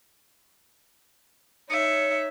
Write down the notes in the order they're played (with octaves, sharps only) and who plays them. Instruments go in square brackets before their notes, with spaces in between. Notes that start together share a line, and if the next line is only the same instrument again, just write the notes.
[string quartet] D#4 E5 [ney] C#5 [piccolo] C#7